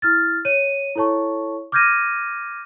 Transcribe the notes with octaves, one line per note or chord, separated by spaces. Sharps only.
E4 F6 A6
C#5 D#7
E4 A4 C#5 A5 C#6
D6 F6 G6 G#6 A#6 D#7